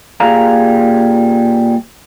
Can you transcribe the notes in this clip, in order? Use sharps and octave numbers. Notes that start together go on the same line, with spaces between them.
A#2 G3 G#4 F5 A#5